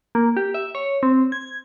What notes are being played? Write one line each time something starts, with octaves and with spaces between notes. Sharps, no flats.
A#3
G4
E5
C#5
C4
G#6